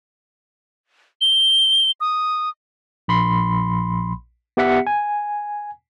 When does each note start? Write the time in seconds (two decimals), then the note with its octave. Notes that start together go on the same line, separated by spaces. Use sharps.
1.21 G7
2.01 D#6
3.08 A#1 B5 C6
4.57 B3 G4 E5 F#5 B6 C#7
4.87 G#5